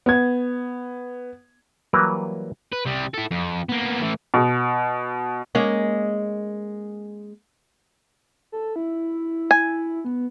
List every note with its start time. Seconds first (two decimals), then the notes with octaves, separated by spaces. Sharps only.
0.06 B3 G#6
1.93 E3 F#3 G3 A#3 A#4 B4
2.73 B4
2.86 C3 G3
3.14 E4 A4
3.31 F2
3.69 A#3 B3
4.01 A2 E3
4.34 B2
5.55 G#3 A#3 C#4
8.52 A4
8.76 E4
9.51 G#5
10.05 B3